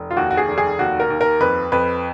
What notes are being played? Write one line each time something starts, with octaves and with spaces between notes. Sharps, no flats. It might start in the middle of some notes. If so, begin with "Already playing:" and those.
Already playing: F1
F4
D#2 F#4
F#4
G#4
F1
G#4
D#2 F#4
A#4
D#2
A#4
F2 B4
F2 B4